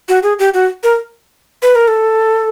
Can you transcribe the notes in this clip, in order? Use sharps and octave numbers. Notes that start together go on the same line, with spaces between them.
F#4
G#4
G4
F#4
A#4
B4
A#4
A4